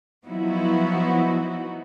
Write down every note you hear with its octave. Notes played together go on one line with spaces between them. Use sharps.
F3 F#3 B3 D#4 E4 F#4